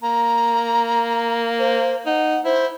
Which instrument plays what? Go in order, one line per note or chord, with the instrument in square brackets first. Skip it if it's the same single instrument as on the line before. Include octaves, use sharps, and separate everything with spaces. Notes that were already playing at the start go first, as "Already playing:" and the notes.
[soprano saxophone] A#3 [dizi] A#5
[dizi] C5
[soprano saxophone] D#4 [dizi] F#5
[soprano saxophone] E4 [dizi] C5